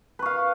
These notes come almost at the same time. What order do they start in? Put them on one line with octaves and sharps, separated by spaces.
B4 C#6 F5